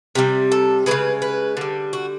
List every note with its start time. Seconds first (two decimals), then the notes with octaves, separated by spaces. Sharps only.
0.15 C3 E3 G3
0.52 A4
0.86 E3 G#3 B4
0.91 C#3
1.22 B4
1.57 D3 G3
1.93 F#4